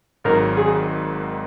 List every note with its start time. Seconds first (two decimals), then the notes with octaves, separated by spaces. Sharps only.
0.24 G#1 G#2 D#3 F#3 A#4
0.57 G#4